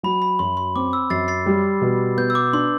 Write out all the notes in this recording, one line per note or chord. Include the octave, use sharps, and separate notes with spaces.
F#3 B5
B5
F#2 C6
C6
C4 D6
E6
F#2 A6 C7
A6 C7
G3
B2
B3 G6
E6
D6
D4 C6